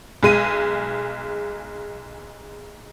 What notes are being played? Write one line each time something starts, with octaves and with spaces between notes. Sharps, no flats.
B1 G#3 D#7